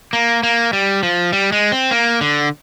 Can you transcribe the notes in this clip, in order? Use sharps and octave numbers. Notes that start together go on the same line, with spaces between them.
A#3
A#3
G3
F3
G3
G#3
C4
A#3
D3